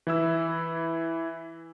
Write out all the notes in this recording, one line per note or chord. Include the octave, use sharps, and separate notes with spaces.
E3 E4 E6